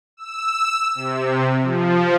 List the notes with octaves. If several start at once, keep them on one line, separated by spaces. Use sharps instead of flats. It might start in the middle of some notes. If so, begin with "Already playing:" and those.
E6
C3
F3